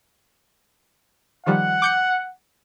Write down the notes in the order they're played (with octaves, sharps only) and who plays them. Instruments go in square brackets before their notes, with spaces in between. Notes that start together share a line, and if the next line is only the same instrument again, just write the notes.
[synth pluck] D#3 F3 G3 [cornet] F#5
[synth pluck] D6 G6 C#7